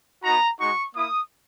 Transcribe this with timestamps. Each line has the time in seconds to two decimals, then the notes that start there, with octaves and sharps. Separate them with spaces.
0.24 B3 D#4 F#4 A#5
0.59 G#3 D#4 F#4 C#6
0.95 A#3 E4 D#6